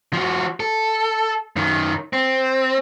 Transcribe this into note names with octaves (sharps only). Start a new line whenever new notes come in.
F3 F#4
A4
F#2 D#3
C4